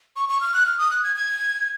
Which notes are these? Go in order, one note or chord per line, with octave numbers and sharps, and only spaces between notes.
C#6
C#6
F6
F#6
F6
D#6
F#6
G#6
G#6